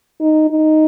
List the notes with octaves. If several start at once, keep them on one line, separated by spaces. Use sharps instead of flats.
D#4
D#4